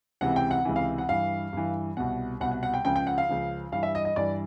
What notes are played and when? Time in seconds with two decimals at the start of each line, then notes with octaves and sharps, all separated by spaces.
0.21 C#2 C3 E3 F#5
0.36 G5
0.51 F#5
0.65 C#2 C3 E3
0.76 F5
0.98 F#5
1.09 G2 E3 F5
1.53 G2 E3
1.97 C2 B2 F#5
2.40 C2 B2 F#5
2.52 F#5
2.63 F#5
2.74 G5
2.85 C#2 C#3 F3 G5
2.96 G5
3.07 F#5
3.18 F5
3.29 C#2 C#3 F3
3.72 G2 E3 F5
3.83 E5
3.95 D#5
4.05 D#5
4.16 G2 E3 D5